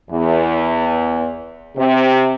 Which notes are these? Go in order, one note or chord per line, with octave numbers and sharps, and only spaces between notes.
E2
C3